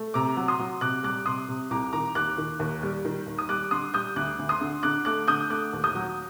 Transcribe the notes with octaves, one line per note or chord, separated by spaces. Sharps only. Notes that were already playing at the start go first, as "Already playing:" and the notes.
Already playing: A3
C3 A#5 D6
F#3
C6 D#6
F#3
C3 D6 F#6
G3 D6 F#6
C3 C6 D#6
C3
C2 A#5 D6
D#3 A#5 D6
D#2 D6 F#6
D#3
D#2
G3
D#3
D#2
D#6
G3 D6 F#6
D3 C6 D#6
G3 D#6 G6
D2 D6 F#6
D2
C6 D#6
D3
D3 D6 F#6
A3 D6 F#6
D3 D#6 G6
A3 D6 F#6
D#2
D#6 G6
F#3